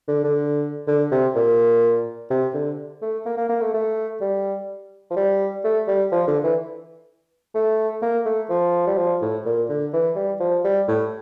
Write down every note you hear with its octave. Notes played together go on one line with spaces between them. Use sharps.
D3
D3
D3
C3
A#2
C3
D3
A3
A#3
A#3
A#3
A3
A3
G3
F3
G3
A3
G3
F3
D3
E3
A3
A#3
A3
F3
G3
F3
A2
A#2
D3
E3
G3
F3
G3
A2